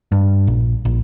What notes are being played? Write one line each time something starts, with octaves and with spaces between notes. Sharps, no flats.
G2
A#1
A#1